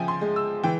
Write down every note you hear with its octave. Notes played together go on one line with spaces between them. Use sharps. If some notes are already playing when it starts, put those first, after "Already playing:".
Already playing: C#3 F3 E5 G5 G#5
C6
G#3
E6
E3 G5